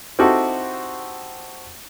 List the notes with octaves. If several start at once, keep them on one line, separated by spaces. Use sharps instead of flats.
C4 D#4 E4 F#4 G4 A4